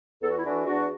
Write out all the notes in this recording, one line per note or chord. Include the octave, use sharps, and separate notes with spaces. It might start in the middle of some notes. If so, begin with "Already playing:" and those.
E2 A4
F#4
E4
E3 A3 D4 F#4
E2 D4 F#4